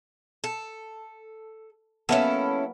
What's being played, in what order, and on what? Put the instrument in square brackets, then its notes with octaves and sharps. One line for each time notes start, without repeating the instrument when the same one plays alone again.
[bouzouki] A4
[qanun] F#3 A#3 B3 [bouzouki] C#4 E4 A4